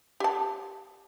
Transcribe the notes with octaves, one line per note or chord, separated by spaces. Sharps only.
G4 A5